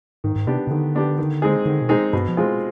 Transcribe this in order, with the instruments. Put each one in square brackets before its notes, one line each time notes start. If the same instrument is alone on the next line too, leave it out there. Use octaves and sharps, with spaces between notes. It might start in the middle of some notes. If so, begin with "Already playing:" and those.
[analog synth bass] G#2 [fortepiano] D#3
[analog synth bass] G#2
[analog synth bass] C3 [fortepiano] B3 D4 G4
[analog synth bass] C3
[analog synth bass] D3 [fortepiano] D#3
[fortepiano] B3 D4 G4
D#3
G#3 C4 D#4 G#4
[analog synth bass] D3 [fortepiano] D#3
[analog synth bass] B2
[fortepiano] G#3 C4 D#4 G#4
[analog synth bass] G2 [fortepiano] B2
[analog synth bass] F3
[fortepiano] G#3 C4 F4 G#4